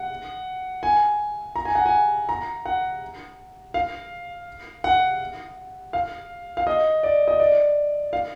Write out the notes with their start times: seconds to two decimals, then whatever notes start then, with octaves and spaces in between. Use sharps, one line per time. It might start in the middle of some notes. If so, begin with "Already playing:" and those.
Already playing: F#5
0.83 G#5
1.56 A#5
1.65 G#5
1.75 F#5
1.86 G#5
2.29 A#5
2.66 F#5
3.74 F5
4.84 F#5
5.93 F5
6.57 F5
6.67 D#5
7.03 D5
7.28 D#5
7.40 D5
8.13 F5